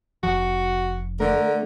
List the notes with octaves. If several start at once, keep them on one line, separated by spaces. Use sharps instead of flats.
F1 F3 F#4
D3 A3 A#4